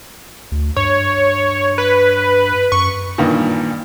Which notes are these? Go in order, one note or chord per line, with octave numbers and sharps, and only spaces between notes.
D2
G2 C#5
B4
F#2 C#6
G2 A#2 D#3 E3